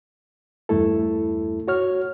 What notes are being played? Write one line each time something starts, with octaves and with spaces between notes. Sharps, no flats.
E2 G2 A3 E4 A4
F#4 C#5 F6